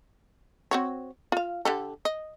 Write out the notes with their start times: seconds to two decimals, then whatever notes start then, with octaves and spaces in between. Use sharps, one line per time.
0.71 C4 F#4 C#5
1.32 F4 F5
1.65 D3 G4 A4
2.05 D#5